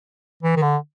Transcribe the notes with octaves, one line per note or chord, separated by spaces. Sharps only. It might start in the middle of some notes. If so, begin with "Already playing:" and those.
E3
D#3
D3